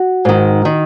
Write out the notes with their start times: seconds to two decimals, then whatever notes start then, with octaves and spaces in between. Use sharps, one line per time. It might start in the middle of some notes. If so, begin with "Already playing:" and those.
Already playing: F#4
0.25 G#2 D#3
0.65 D#3